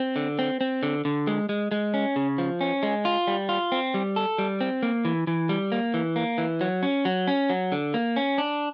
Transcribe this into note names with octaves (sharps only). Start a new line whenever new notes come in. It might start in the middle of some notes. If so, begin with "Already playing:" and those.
Already playing: C4
D3
C4
C4
D3
D3
G#3
G#3
G#3
C#4
C#3
F3
C#4
G#3
F4
G3
F4
C4
G3
A4
G3
C4
A#3
E3
E3
G3
A#3
E3
A#3
E3
F#3
C#4
F#3
C#4
F#3
D3
A#3
C#4
D4